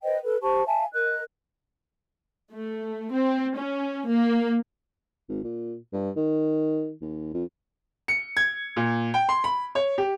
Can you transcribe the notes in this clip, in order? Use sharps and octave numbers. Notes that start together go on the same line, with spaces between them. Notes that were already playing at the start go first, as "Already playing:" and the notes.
B4 C5 D#5 G5
A4 B4
G4 C5 A5 C#6
E5 F5 G#5 A5
A#4 D#5 F#6
A3
C4
C#4
A#3
G#1
A#2
G2
D#3
D#2
F2
C#7
G#6
A#2
G5
C6
B5
C#5
G4